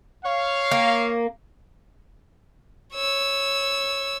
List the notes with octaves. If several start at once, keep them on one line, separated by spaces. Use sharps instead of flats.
C#5 F5
A#3
C#5 E6